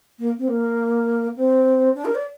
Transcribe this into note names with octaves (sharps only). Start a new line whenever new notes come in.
A#3
C4
A#3
C4
D4
A#4
D5